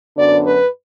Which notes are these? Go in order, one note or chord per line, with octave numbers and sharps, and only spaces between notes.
F#2 D3 F#3 B3 D4 D5
B4